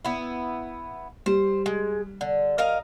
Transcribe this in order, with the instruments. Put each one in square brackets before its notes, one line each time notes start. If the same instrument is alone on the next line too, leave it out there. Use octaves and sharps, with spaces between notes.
[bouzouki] B3 E4
[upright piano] G3 [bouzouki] C5
[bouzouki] G#3
D3
A#4 D#5 F5